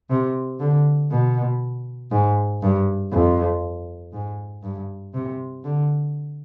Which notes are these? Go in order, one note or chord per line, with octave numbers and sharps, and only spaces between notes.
C3
D3
B2
G#2
G2
F2
G#2
G2
C3
D3